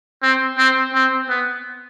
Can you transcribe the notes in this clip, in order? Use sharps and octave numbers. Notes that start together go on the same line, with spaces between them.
C4
C4
C4
B3